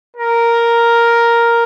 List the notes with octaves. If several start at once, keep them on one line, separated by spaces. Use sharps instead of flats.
A#4